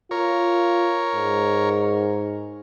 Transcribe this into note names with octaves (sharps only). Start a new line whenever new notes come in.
F4 A#4 C#5
G#2